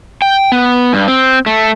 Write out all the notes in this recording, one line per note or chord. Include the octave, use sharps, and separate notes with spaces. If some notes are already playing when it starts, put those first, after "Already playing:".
G5
B3
G2
C4
A3